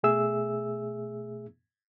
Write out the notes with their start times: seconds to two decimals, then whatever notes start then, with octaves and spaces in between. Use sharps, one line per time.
0.03 B2 A3 G#4 E5 E6